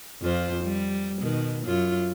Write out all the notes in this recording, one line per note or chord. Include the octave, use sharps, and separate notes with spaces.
F2 F4 C5
G3
B2 D#3
F#2 F#3 F4